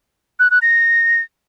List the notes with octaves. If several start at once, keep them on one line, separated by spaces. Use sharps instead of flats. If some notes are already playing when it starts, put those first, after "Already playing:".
F#6
F#6
A#6